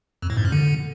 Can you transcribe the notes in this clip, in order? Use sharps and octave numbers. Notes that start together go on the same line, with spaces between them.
F2
A2
G#2
F#2
D3